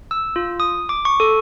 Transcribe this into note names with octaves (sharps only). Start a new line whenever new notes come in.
E6
F4
D#6
D6
C#6
A4